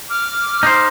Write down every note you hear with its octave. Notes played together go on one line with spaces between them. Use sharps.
D6 F6
D#4 C5